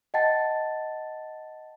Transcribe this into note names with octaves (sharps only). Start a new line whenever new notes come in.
D#5 F#5 G5 A5 A6